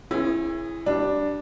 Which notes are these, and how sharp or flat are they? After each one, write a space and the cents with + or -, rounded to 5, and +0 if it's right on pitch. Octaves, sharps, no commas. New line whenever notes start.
C#4 -40 E4 +15 G#4 +0
G3 -25 D4 +0